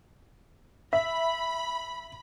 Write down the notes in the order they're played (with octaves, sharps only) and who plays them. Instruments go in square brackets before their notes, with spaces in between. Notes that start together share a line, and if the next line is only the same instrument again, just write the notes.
[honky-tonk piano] E5 [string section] B5